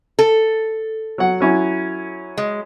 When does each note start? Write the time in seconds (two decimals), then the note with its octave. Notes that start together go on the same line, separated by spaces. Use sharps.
0.19 A4
1.18 F#3 F#5
1.40 F#3 C#4 E4
2.37 G#3